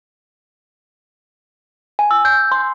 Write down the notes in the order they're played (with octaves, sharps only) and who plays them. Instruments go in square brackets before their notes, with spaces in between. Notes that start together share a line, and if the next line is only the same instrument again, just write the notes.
[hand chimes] G#5
E6
G6
C6